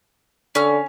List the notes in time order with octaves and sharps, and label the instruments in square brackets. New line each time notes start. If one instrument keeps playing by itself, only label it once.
[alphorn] D3 [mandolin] C#4 F6